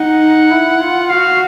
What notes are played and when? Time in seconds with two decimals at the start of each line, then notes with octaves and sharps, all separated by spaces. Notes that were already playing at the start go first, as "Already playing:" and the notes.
Already playing: D#4 F#5
0.50 E4
0.80 F4
1.10 F#4 F5